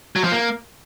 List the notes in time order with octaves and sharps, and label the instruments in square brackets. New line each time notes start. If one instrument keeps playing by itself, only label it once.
[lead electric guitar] F#3
F3
A#3